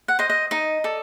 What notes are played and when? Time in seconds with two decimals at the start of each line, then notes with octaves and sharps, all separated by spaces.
0.08 F#5
0.19 C5 D#5
0.30 D#5
0.51 D#4 D#5
0.84 A4 D5